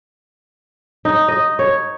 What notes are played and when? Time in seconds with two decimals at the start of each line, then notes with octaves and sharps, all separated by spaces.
1.05 D#4
1.28 D#5
1.59 C#5